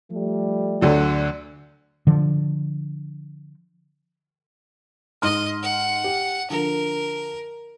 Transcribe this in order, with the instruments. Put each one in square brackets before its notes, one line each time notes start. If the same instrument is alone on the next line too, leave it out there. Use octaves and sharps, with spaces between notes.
[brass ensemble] F3 G3 A3
[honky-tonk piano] D2 D3 F#3
[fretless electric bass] D3 F3
[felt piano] G#2 C6 F6 [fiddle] D#5
[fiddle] F#5
[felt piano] G4
[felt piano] D3 F3 [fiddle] A#4